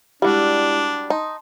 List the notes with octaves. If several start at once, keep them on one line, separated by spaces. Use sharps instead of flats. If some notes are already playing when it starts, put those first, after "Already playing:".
G3 G#3 D4 E4 F#4 G4
D#4 A5 C6